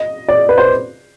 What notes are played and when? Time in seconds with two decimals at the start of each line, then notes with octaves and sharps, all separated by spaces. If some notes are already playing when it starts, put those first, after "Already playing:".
Already playing: D#5
0.29 D5
0.49 B4
0.58 C5